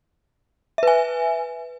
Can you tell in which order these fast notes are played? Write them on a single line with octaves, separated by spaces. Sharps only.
E5 B4 G#5